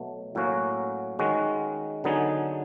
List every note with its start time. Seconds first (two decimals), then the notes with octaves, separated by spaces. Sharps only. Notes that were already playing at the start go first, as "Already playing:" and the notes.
Already playing: B2 F#3 A3
0.35 A2 F#3 A#3 C#4 F#4
1.19 D#3 G#3 C#4 F#4
2.04 D3 F#3 B3 D#4 G#4